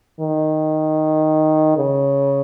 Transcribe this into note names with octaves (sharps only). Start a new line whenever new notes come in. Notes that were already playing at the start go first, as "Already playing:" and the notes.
D#3
C#3